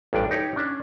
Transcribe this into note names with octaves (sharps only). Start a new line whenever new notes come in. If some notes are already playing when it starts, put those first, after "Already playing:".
A1 G2 D4 D5
D#4 G4 C#5
C#4 D4